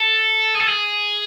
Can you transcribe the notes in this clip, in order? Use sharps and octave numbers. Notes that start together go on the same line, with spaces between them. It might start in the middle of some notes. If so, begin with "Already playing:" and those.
Already playing: A4
G#4
A4
G#4